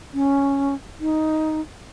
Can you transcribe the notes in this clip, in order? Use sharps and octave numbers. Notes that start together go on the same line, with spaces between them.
C#4
D#4